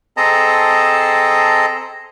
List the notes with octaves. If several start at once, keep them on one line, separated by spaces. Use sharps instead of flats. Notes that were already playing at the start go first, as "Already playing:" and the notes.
C4 G#4 A4 D#5 A5 A#5